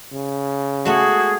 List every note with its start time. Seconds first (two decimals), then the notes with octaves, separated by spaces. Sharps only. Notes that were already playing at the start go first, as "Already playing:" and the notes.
0.13 C#3
0.85 G#3 A3 B3 F#4 G#4